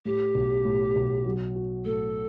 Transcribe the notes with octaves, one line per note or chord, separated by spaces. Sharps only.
A2 G4
B1
A2
B1
F#3
F#4
A2 A4